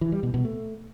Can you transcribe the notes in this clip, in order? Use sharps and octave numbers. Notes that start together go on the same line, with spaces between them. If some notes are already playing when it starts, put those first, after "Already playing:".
E3
G3
B2
B2
A3